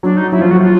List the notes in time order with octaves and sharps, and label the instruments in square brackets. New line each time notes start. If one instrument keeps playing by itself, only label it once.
[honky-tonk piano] F#3 [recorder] D4
[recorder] D#4
[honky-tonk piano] F#3 [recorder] E4
[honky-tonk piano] F3 [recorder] F4
[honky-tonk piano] F#3 [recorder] F#4
[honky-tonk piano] F#3 [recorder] F4